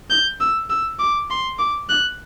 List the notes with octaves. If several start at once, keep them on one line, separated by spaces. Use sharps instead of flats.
G6
E6
E6
D6
C6
D6
F#6